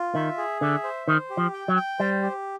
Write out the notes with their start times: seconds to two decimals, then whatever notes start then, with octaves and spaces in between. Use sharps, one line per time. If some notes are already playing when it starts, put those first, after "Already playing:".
Already playing: F4
0.15 D#3 E5
0.38 G#4
0.61 D3 E5
0.84 C5
1.07 D#3 C5
1.30 G4
1.37 F3
1.53 G5
1.68 F#3
1.76 G5
1.99 G3 C5
2.22 G4